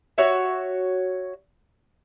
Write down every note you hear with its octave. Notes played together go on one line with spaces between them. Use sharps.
F#4 C#5 E5